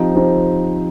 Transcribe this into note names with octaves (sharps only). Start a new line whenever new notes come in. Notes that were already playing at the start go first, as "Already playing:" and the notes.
Already playing: F3 C4 D#4 G4
F3 C4 D#4 G4